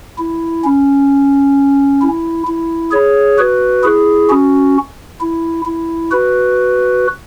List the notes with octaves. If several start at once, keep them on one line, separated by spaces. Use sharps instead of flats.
E4
C#4
E4
E4
G#4 C#5
F#4 B4
E4 G#4
C#4 F#4
E4
E4
F#4 B4